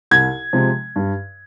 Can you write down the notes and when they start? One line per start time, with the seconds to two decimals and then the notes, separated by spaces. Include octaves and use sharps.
0.11 C2 G#6
0.53 C3 F3 G#3
0.96 G2